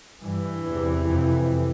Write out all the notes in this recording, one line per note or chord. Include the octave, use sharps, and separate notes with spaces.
G2 E3
E2 C3
F2 C3